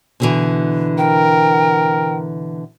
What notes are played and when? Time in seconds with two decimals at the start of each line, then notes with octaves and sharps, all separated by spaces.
0.20 B2 D3 E3
0.98 A#4 G5